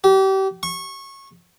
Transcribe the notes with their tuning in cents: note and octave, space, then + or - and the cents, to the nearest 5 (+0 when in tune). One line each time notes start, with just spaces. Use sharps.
G4 -30
C#6 -20